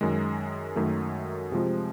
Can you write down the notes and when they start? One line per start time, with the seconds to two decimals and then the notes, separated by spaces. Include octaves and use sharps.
0.01 F#2 D#3 G#3
0.76 F#2 D#3 F#3 A3
1.52 C3 F3 G#3